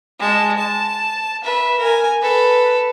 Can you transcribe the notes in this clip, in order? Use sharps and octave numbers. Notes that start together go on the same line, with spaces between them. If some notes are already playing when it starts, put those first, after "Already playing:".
G#3 A5
A5
B4 E5
A#4 G#5
A4 B4